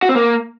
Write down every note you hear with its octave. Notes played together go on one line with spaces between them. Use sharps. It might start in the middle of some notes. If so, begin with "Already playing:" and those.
F#4
C4
A#3